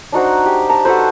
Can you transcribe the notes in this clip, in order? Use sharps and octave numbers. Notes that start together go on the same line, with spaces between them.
D4 D#4 F#4 C5
G4
A5 A#5
F#4 A4 B4 C5